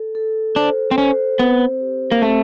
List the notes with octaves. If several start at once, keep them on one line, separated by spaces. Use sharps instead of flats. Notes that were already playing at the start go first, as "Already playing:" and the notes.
Already playing: A4
A4
D4 C5
C4
C#4 C5
B3 C4
G4
A#3
A3 C4